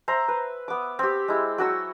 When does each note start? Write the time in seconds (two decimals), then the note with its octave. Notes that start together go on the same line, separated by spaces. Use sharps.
0.08 C5 E5 A#5
0.28 B4
0.68 B3 D6
0.99 C4 G4
1.28 G#3 E4
1.58 F#3 F#4 C#6 E6